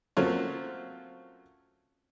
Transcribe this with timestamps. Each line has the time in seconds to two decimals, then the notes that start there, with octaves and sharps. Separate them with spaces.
0.17 F#3 A3 A#3 C4 C#4 F4